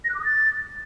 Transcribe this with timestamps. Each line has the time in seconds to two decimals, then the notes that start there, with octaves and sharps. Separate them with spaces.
0.04 A#6
0.10 F#6
0.15 D6
0.20 D#6
0.25 A6